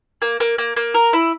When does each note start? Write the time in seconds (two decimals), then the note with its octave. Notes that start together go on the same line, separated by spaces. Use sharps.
0.22 A#3
0.40 A#3
0.58 A#3
0.76 A#3
0.94 A#4
1.13 E4